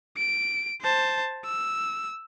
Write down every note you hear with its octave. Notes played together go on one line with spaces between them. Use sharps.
D7
C5 A5
E6